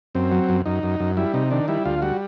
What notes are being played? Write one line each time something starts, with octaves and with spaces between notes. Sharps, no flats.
F#2 C4
F#3
F#2
F#2 D#4
F#2
F#2
G3 E4
C3 D#4
D#3 D4
G3 E4
D2 F4
G3 F#4